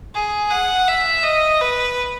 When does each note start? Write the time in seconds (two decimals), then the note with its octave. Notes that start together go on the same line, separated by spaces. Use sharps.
0.14 G#4
0.50 F#5
0.88 E5
1.23 D#5
1.61 B4